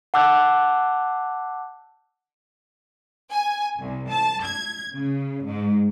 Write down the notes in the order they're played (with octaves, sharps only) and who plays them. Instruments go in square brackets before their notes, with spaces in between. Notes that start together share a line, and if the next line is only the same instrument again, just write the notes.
[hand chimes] F#5 A5 D6 E6 F#6 G6
[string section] G#5
C2
A5
G#6
C#3
G#2